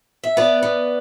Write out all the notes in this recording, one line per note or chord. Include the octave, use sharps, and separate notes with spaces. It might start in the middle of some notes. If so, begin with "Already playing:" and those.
E5
B3 B4 D5
B3